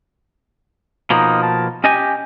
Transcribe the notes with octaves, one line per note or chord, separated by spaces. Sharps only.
B2 F3 A#3 D#4
A5
C#4 G4 D#5 G#5